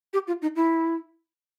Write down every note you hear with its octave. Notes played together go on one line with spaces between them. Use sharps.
G4
F4
D#4
E4